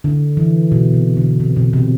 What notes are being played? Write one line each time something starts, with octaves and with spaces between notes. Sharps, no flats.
D3
E3
B2
C3
D3
C3
B2
C3